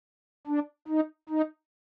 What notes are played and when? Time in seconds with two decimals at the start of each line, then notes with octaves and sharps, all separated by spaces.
0.47 D4
0.88 D#4
1.29 D#4